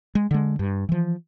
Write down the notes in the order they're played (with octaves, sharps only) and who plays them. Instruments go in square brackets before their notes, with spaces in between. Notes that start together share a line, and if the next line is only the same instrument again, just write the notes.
[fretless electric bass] G#3
D3 G#3
G2
E3 F3